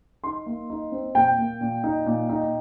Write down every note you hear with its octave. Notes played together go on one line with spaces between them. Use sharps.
D#4 C6
A#3
D#4
C4
A#2 G5
A#3
A#2
D#4
A#2
D#4